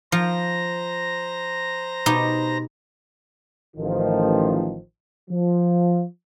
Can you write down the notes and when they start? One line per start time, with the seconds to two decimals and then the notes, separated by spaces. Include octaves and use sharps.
0.12 F3 C5 A#5 A#6
2.06 B2 D#4 G4
3.77 A1 D#3 F3
5.30 F3